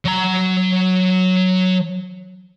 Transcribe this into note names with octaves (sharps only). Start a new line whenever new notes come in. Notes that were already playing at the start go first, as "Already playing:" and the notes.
F#3 A#5